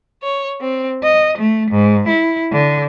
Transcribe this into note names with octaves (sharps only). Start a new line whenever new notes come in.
C#5
C4
D#5
A3
G#2
E4
D3